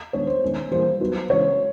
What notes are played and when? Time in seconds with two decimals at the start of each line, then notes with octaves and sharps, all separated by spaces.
0.13 D#3 G#3 B3 D4 C#5
0.27 C5
0.42 D#3 G#3 B3
0.71 E3 G3 A#3 C5
1.00 F#3 B3 D#4 F#4 B4
1.29 C#3 E3 G#3 C#4 C#5